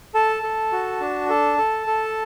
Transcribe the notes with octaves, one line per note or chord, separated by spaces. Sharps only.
A4 A5
A4
F#4
D4
A4 A5
A4
A4